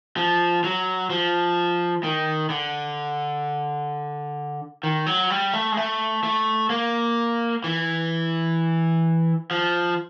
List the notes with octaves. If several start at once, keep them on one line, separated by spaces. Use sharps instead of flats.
F3
F#3
F3
D#3
D3
D#3
F#3
G3
A3
G#3
A3
A3
A#3
E3
F3